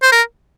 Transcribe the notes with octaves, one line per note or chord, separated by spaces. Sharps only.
C5
A#4